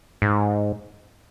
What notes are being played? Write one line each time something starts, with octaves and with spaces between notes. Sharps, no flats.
G#2